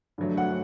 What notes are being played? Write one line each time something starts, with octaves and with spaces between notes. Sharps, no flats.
G2 D3 F#3 A3
F#5